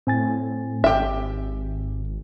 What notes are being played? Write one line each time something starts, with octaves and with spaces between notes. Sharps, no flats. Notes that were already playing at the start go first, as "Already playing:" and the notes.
A2 C4 G#5 A6
G#1 G4 E5